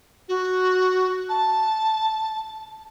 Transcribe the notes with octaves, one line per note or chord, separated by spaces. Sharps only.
F#4
A5